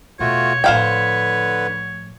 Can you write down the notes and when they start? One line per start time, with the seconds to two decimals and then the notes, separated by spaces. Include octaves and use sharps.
0.20 E2 B2 A3 F4 F#4 C#5
0.64 A2 D3 F3 B4 C5 F5 G5